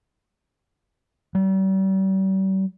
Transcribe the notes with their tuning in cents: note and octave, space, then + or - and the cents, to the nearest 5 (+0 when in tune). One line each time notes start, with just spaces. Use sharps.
G3 -40